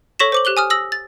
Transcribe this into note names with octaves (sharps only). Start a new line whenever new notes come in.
A4 C#5 C#6 A#6 B6 E7
C5 D6 F#7
G4 F#6 F#7 G7
G#5 D#6 F6
D#6 E6 A#6 F#7
A6